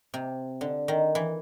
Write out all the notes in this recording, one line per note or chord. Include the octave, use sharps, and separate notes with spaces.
C3
D3
D#3
E3